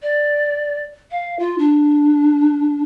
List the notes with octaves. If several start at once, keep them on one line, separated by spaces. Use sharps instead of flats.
D5
F5
F4
D4